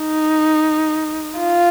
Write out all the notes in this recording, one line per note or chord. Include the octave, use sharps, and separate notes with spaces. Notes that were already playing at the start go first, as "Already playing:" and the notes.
Already playing: D#4
F4